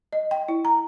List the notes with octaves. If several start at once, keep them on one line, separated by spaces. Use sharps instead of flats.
D#5
G5
E4
A#5